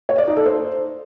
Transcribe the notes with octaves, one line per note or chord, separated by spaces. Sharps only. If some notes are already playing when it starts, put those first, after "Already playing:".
C#5
D5
D#4
A4
C5